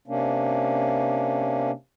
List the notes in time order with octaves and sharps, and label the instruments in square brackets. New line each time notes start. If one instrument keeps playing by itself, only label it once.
[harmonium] C3 A#3 C#4 D4